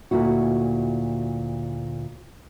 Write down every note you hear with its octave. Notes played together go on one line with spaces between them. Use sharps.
D2 A#2 E4 F#4